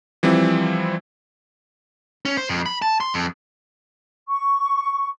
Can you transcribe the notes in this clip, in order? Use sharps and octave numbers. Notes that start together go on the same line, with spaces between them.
E3 F3 G3 C4 E4
C#4
C5
F2
B5
A5
C6
F2
C#6